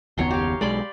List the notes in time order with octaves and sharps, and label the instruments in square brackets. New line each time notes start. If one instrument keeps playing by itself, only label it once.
[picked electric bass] F#1 D#2 B3 [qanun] C#5 A#5 C6
[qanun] G4 F5
[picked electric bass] B1 G#3 [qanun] D5 B5 C6